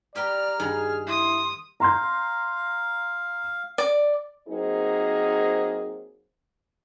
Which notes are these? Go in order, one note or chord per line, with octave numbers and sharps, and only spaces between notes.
G4 B4 D5 G5 A#5 F6
G2 D#3 G#4
E4 C6 D#6
F5 A#5 C6 G6
D5
F#3 A#3 C4 D#4 G#4 C5